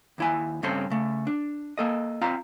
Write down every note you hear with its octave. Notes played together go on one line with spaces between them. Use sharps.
D#2 E4 G#5
G2 C#3 C4 C#4 A4 C6
C#3 A3
D4
A#3 A4 D#5
C4 F4 F5 A#5